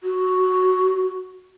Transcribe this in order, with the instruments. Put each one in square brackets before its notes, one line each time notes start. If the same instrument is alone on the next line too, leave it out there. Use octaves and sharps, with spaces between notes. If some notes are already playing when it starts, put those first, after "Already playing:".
[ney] F#4